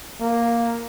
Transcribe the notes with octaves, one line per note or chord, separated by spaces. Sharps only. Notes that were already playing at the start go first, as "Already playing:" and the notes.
A#3